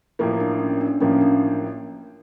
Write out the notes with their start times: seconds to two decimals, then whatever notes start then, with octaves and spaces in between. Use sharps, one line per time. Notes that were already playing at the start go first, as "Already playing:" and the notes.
0.19 A1 A2 F3 A#3 E4
0.40 D4
0.59 C#4
0.81 D4
1.00 A1 A2 F3 A#3 C#4
1.21 D4